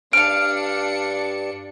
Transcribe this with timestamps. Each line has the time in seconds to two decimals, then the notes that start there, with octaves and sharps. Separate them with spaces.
0.13 G2 D4 F5 F6 C#7 D7